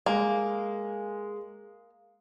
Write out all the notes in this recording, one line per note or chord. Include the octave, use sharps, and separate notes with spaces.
G#3 A#3